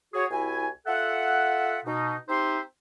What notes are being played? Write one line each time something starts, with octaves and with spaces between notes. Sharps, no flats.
F#4 G#4 C#5
C2 E4 F#4 G#5
F4 A4 E5 F#5
B2 D#4
C4 D#4 G4 C5 E5 C6